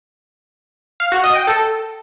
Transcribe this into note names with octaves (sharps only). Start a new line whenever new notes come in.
F5
F#4
D#5
G5
A4